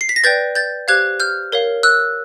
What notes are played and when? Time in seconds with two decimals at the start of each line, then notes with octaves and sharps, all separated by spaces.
0.01 C7
0.09 B6
0.16 A#6
0.24 B4 D5 G5 G6 A6
0.55 G6 A6
0.88 G4 C5 F5 F#6 G#6
1.20 F6 G6
1.52 A#4 C#5 F5
1.83 E6 F#6